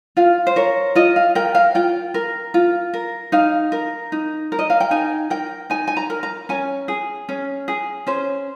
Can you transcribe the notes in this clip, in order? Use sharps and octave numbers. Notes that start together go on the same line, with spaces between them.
F4 F5
C5
A#4 C#5
F4 D#5
F5
A#4 G5
F5
F4 G5
A#4
F4
A#4
D#4 F5
A#4
D#4
A#4
D#5
F5
G5
D#4 G#5
A#4 G5
D#4 G#5
G#5
A#5
A#4
A#5
C#4 G#5
G#4
C#4
G#4
C#4 C5